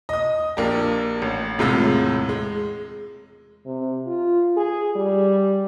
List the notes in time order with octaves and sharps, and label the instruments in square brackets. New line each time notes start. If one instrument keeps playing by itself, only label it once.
[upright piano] D#5 D#6
A#1 A#3 D4 G4
A1
E1 A2 C3 G#3 F4 E6
G#3
[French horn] C3
F4
G#4
G3